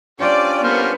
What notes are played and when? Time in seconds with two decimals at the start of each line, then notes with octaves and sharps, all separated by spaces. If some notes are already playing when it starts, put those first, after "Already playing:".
0.20 C#4 D4 F4 G4 C5 D5 D6
0.64 G3 A#3 B3 C5 F6